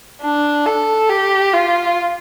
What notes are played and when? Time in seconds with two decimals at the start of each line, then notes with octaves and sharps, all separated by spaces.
0.21 D4
0.66 A4
1.09 G4
1.53 F4